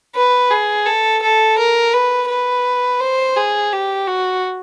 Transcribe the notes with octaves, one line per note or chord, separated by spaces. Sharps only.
B4
G#4
A4
A4
A#4
B4
B4
C5
G#4
G4
F#4